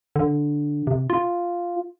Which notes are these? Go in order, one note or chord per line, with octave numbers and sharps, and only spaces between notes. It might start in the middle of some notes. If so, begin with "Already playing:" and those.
D3
C3
F4